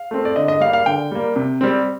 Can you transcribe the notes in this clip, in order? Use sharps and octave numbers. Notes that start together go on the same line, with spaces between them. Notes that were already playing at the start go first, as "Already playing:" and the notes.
Already playing: F5
A3 C4
D5
D3 D#5
D#5
G3 A#3 F5
F5
D3 G5
G3 A#3
C3
G3 C4